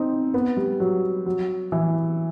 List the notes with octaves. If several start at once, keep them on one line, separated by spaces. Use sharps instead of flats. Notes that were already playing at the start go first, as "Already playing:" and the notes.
Already playing: C4 D#4
B3
G3
F#3
F#3
E3